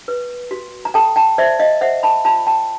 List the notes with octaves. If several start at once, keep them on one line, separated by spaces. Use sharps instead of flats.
B4
F#4
A#5
A4 G5 A5
G5 A5
C5 D5 E5
D#5 F5
C5 E5 F#5
A5 B5
F4 A5 B5
G5 A5